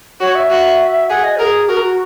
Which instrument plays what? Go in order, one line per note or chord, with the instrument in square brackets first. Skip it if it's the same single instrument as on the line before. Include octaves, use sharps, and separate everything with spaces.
[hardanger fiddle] F#4 [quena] C#5
[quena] E5
[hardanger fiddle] F#4
[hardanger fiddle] G#4 [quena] F#5
[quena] D#5
[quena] G#4 [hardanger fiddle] A#4
[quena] F#4 [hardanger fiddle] A#4
[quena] F#4